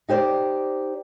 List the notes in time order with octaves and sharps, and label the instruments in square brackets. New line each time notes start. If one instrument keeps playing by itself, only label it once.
[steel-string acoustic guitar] D#4 G4 C5 D5